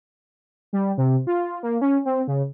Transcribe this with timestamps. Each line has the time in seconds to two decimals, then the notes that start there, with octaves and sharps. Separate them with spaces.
0.73 G3
0.98 C3
1.27 F4
1.63 A#3
1.81 C#4
2.05 C4
2.28 C#3